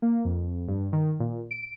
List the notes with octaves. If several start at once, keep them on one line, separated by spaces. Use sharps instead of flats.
A#3
F2
G2
D#3
A#2
D7